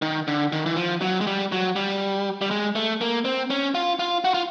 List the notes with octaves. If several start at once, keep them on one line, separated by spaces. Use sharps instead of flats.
D#3
D3
D#3
E3
F3
F#3
G#3
G3
F#3
G3
G3
G#3
A3
A#3
C4
C#4
F4
F4
F#4
F4